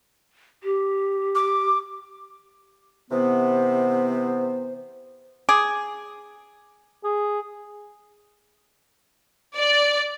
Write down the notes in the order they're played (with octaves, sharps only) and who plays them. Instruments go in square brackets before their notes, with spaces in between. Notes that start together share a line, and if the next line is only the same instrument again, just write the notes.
[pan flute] G4
[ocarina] D6
[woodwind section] C3 E3 B3 [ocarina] C5
[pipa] G#4 [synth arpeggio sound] D6
[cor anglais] G#4
[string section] D5